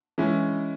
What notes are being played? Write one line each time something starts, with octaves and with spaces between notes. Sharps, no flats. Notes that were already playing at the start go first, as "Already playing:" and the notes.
E3 G#3 C#4 E4